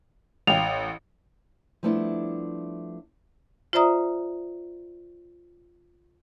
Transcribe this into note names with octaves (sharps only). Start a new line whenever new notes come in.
A1 F5 G5 F7
F3 G3 A3 B3 D4 E4
F4 C5 D5 E5 A#5 D#6